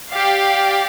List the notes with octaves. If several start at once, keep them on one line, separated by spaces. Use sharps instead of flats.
G4 D5 F5